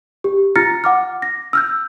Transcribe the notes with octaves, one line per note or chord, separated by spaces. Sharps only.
G4
F4 A#5 F6 A6 A#6 C#7
F#5 D6 F6
A#6
E6 F6 G6